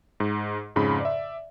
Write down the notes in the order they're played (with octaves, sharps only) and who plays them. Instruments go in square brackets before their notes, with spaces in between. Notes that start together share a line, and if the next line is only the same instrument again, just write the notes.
[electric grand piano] G#2
F2 G#2 C#3 B5
D5 E5